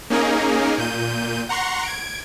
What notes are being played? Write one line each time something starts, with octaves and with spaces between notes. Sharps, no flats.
A#3 C#4 D#4 G#4 A#4
A#2 G6 D#7
F#5 A#5 C6 C#6
G#6 D7